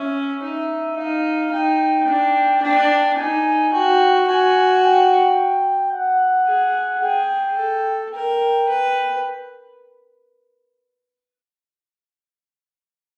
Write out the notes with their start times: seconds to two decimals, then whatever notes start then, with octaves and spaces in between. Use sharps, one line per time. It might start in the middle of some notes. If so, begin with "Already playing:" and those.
Already playing: C#4 E5
0.42 D#4
0.97 D#4 F5
1.52 D#4 G5
2.08 D4
2.62 D4 G5
3.17 D#4 G#5
3.72 F#4 G5
4.28 F#4 G#5
4.83 G5
5.93 F#5
6.48 G#4
7.03 G#4 G5
7.58 A4
8.13 A#4 G5
8.68 B4